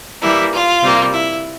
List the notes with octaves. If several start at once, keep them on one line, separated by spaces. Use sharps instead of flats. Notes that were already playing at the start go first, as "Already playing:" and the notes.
E3 G3 A#3 E4
F4
C3 G3 A#3
E4